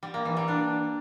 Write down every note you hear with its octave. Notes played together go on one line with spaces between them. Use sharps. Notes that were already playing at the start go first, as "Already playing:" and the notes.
G3
A#3
E3
G3
D4